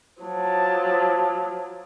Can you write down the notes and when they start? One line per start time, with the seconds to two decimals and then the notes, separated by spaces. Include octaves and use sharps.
0.22 F3 F#3 A5